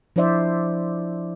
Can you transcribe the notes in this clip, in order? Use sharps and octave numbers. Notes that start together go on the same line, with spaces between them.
F3 D4 E4 C5 D5 E5